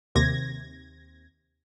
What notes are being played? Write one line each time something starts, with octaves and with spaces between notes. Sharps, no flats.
D#2 C3 G#6 A#6